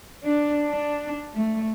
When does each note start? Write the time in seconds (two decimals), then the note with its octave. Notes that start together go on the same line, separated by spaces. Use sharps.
0.24 D4
0.66 D4
1.33 A3